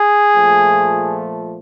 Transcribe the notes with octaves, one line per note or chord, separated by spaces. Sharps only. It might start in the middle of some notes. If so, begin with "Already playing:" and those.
Already playing: G#4
A#2 F3 A3